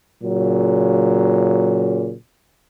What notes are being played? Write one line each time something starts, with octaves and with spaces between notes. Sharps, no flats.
A#2 C#3 F#3